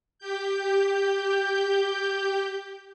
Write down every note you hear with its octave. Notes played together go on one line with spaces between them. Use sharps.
G4 G6